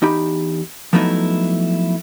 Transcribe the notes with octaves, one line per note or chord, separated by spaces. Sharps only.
E2 D#4 G4 B5
F3 F#3 A3 B3 D#4 E4